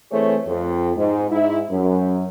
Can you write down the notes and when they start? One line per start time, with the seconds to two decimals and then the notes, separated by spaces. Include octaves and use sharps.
0.12 E3 A3 C4 G#4 C5 C#5
0.47 F2
0.97 G#2
1.31 G#2 E4
1.71 F#2